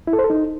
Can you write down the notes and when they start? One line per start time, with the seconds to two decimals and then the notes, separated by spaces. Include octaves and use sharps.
0.07 E4
0.13 A4
0.19 C5
0.24 A4
0.30 D#4